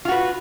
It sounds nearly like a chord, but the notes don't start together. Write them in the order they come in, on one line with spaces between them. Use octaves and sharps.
F4 F#4 B4